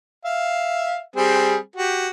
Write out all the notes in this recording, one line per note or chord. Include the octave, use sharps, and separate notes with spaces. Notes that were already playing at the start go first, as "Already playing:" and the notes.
E5 F5
G3 C4 G#4
F#4 G4